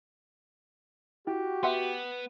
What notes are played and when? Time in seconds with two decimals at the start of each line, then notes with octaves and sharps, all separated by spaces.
1.27 E4 F#4 G4
1.63 B3 E5 F#5 C6